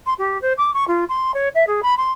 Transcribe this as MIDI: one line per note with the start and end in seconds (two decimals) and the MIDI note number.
0.06 0.14 84
0.19 0.40 67
0.42 0.53 72
0.58 0.73 86
0.74 0.85 85
0.88 1.05 65
1.09 1.32 84
1.34 1.49 73
1.55 1.64 76
1.67 1.81 68
1.83 1.95 83
1.98 2.12 84